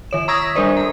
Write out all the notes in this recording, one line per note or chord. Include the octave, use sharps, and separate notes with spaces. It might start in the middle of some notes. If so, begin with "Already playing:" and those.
D#3 C#5 E7
A#5 C#6 D#6 E6 G#6 A#6
B6
G3 D4 A#4 C5 D5
A#5